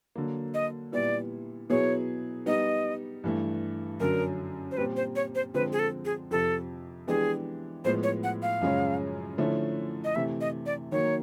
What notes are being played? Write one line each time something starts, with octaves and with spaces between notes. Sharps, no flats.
D3 F#3 A#3
D#5
A#2 G3 B3 E4 D5
B2 F#3 B3 E4 G#4 C#5
G3 B3 D#4 D#5
G2 E3 A3
F#2 D3 F#3 A#4
C5
A#2 G3 C4 B4
C5
C#5
C5
D3 F3 G#3 C4 B4
G#4
A4
G#4
F2 C3 F3 A4
E3 G#3 B3 D4 G4 G#4
A2 F3 G#3 B3 C5
C#5
F#5
F5
F#2 C#3 F3 G#3 C#4
D3 F3 A3 C#4 E4
D#5
C3 E3 A3 E5
D#5
D5
D#3 F#3 A#3 C#5